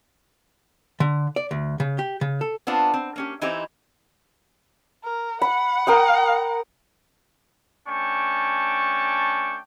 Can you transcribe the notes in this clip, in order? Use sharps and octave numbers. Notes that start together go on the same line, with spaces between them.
D3
D5
D2
C#3
G4
C#3
A4
B3 C4 D4 F4
C4
A#3 C#4 G4
E3 C4 D#4 E4 G4 C5
A#4
F#5 B5
A#4 G5 D#6
A3 C#4 D4 G5 A5 C#6